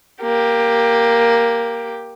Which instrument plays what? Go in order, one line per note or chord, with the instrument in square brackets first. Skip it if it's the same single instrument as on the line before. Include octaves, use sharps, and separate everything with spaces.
[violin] A#3 G4